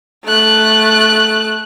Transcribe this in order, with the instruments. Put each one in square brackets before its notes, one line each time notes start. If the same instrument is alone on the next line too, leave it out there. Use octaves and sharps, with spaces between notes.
[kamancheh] A3 F#6